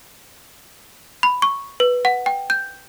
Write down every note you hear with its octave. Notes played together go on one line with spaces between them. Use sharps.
B5
C#6
B4
F#5
G5
G6